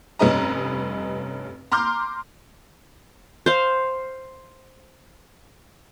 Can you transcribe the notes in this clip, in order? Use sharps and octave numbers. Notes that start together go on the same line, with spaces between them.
F1 G2 C#4 B4 D#5 A#5
A#5 C6 D6 F6 G6
C5 F5